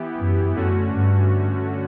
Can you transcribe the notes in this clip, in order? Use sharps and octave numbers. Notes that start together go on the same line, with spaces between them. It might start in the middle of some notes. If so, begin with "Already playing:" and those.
Already playing: E3 B3 E4 G4
F#2
F#2 D3 A3 C#4 F#4
G2